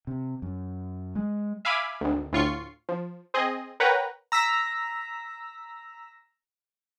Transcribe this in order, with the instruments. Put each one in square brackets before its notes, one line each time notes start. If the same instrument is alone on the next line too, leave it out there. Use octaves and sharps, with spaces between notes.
[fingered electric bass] C3
F#2
G#3
[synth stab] E5 F5 G#5 B5 D6
G#1 D2
D2 A2 F4 C#6 C7
F3
C4 G#4 D#5
A#4 B4 C#5 F#5 G5 A#5
[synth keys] A#5 E6 A#6 B6